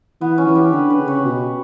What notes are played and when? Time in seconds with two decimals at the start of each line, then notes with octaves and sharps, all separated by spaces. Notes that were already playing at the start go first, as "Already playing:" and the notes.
0.21 E3 B3
0.38 C#4
0.47 E3
0.55 G4
0.72 D3 B4
0.90 B4
0.98 C#3
1.08 C#5
1.25 B2